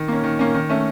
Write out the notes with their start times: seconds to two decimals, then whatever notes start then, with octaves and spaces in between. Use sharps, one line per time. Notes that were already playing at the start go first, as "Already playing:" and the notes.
Already playing: D#3
0.08 A#3 C#4
0.24 D#3
0.39 A#3 C#4
0.54 D#3
0.69 A3 C#4